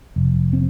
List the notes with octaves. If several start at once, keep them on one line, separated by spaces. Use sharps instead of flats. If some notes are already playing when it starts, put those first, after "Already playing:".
F1
C4